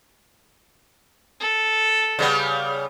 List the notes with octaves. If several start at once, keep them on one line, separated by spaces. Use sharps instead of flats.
A4
C#3 G3 B3